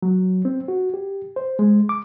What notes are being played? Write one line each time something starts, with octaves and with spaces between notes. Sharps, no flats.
F#3
C4
F#4
G4
C5
G#3
D6